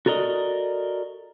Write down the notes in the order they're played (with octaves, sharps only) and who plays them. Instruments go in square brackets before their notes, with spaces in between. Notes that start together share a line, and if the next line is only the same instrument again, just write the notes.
[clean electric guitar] F#4 A4 A#4 D5 D#5